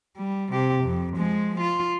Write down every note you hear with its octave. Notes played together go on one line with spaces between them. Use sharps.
G3
C3 G4
F2
F3 G#3
F4